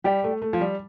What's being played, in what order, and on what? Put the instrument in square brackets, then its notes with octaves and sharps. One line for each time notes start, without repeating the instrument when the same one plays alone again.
[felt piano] G3 [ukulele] G4 D5 G5
[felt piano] A3
A3
F3
G3